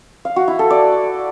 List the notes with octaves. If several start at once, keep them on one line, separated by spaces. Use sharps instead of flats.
F5
F#4
E4
A4
D5